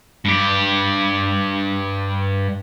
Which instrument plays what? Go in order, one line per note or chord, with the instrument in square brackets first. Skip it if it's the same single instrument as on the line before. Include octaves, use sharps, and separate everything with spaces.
[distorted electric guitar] G2 G4